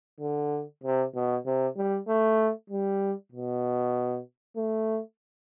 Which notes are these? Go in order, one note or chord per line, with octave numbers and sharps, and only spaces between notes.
D3
C3
B2
C3
G3
A3
G3
B2
A3